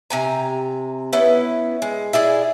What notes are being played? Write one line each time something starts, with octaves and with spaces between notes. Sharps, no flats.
C3 G#5 A#5
B3 C#4 E4 B4
G#3
E4 G#4 D5 D#5